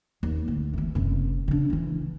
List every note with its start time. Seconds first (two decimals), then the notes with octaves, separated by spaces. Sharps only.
0.23 D#2
0.48 D2
0.74 E3 A3
0.95 F#1 C3
1.48 C#3 D4
1.70 E3 E4